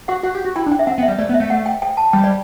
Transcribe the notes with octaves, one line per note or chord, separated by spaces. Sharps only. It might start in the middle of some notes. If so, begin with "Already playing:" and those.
F#4 F#5
F#4 F#5
G4
F#4
E4 G5
D4
G5
E5
C4 F#5
B3
E5
G3
A3 D5
B3
E5
A3
F#5
G5
G5
A5
G3 G5
D5